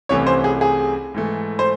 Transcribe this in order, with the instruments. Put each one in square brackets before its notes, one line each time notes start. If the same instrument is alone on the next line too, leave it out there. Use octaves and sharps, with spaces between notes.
[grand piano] C2 C3 E3 A3 C#4 [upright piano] C#5
[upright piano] C5
G#4
G#4
[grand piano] G#2 E3 A3
[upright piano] C5